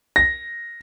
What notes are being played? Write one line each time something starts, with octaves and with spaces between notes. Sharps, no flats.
A#6